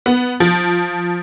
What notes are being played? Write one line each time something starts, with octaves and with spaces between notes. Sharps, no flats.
B3
F3